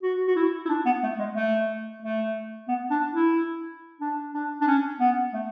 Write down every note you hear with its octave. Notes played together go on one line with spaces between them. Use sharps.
F#4
F#4
E4
E4
D4
B3
A3
G#3
A3
A3
B3
D4
E4
D4
D4
D4
C#4
B3
A3